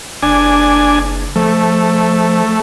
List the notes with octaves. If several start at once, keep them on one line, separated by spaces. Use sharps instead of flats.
F#1 D4 G#5
F3 A3